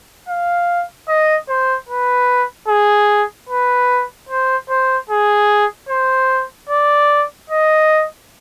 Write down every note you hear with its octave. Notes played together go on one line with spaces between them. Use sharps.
F5
D#5
C5
B4
G#4
B4
C5
C5
G#4
C5
D5
D#5